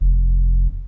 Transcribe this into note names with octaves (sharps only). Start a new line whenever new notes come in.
F1